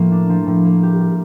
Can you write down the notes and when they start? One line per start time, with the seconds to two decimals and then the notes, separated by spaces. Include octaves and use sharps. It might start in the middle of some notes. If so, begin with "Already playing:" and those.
Already playing: A2 F3 A#3
0.11 D4
0.29 F3
0.47 A2
0.65 A#3
0.83 G4
1.00 G3